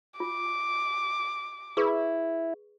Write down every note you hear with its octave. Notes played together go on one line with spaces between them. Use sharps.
F4 D6
E4 G#4 B4 C#6